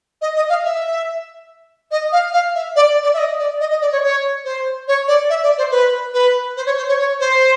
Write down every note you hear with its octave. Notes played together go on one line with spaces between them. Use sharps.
D#5
D#5
F5
E5
D#5
F5
F5
E5
D5
D5
E5
D#5
D5
D#5
D#5
D5
C#5
C#5
C5
C#5
D5
E5
D5
C5
B4
B4
C5
C#5
C5
C#5
C#5
C5